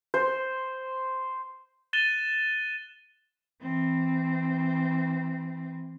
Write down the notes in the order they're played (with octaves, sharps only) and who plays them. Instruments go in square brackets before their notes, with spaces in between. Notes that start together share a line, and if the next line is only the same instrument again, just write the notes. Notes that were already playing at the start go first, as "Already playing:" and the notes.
[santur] C5
[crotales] F#6 A6 D#7 E7 G7
[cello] E3 C4